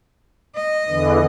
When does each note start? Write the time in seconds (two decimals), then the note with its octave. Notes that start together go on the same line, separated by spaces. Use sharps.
0.55 D#5
0.88 E2 D3 E3